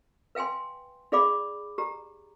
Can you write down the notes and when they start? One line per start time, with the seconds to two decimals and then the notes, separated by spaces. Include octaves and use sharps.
0.35 B4 F5 G5 G#5 C6
1.12 D#4 G#4 D5 F5 B5 D6
1.78 G4 A#5